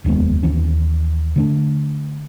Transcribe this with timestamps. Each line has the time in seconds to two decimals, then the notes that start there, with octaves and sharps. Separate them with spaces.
0.04 F1 D#2 G#3 B3
0.43 D#2 E3 C#4
1.36 D3 A3 D4